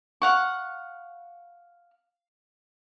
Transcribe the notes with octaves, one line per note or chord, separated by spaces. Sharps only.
F5 F#5 C#6